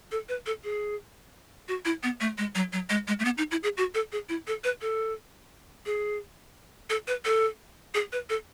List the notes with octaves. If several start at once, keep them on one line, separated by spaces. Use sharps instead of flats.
A4
B4
A4
G#4
F#4
E4
B3
A3
G#3
F#3
F#3
G#3
G#3
A3
B3
D#4
E4
G#4
F#4
A4
G#4
E4
A4
B4
A4
G#4
A4
B4
A4
G#4
B4
A4